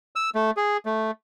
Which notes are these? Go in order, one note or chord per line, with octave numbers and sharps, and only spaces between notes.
E6
A3
G#4
A3